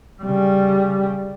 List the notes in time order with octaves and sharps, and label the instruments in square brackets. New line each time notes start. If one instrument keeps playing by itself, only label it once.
[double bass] C#3 G3